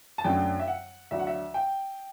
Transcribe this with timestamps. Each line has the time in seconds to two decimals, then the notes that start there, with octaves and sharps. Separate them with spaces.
0.18 A5
0.24 F#2 D3 A3 G5
0.60 E5
0.68 F#5
1.11 D2 D3 F#3 E5
1.19 F#5
1.27 E5
1.54 G5